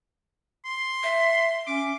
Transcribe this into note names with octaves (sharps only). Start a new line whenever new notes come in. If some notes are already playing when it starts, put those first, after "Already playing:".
C6
E5
C#4 D6